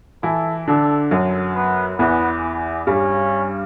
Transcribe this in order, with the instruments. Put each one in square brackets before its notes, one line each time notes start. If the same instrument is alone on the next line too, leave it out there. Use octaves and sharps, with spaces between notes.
[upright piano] E3 E4 [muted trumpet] A4
[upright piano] D3 D4 [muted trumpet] A4
[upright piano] F#2 F#3
[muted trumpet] B3
[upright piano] E2 E3 [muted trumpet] B3
[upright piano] G2 G3 [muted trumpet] C#4